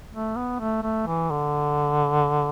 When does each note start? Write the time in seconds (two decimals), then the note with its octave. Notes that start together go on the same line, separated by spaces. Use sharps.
0.13 A3
0.37 B3
0.60 A3
0.83 A3
1.07 E3
1.31 D3